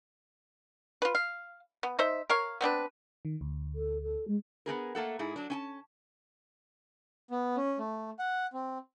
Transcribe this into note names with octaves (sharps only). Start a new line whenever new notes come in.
F4 B4
F5
B3
D#4 C5 E5
A#4 C#5 F5
B3 C4 D4 B4
D#3
D2
A4
A4
G#3
B3 C4 G#4 A#4
A3 A#3 A4 F#5
G#2 E4 G#4
F#3 D4
C#4 G#5 A5
B3
C#4
A3
F#5
C4